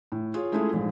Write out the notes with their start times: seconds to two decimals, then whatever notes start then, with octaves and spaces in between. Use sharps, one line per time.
0.12 A2
0.34 F4 G#4 C#5
0.52 G#3 A3 C#4 E4 F4 G#4
0.73 A#1 G#2